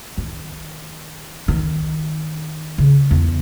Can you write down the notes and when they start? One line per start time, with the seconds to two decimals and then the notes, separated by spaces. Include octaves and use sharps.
0.18 D#3
1.48 D#3
2.78 C#3
3.11 E2